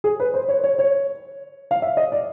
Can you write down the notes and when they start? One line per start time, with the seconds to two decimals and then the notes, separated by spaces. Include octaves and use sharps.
0.04 G#4
0.20 B4
0.34 C5
0.49 C#5
0.64 C#5
0.79 C#5
1.71 F5
1.82 E5
1.97 D#5
2.12 D5